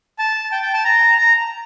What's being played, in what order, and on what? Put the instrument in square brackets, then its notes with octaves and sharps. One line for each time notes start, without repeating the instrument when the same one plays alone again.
[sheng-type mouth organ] A5
G5
G5
A5
A#5
A#5